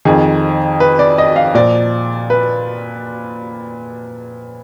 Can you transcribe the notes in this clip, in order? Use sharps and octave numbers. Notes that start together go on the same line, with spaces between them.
F2 D#3 G#4
B4
D5
D#5
F5
A#2 F3 D5
B4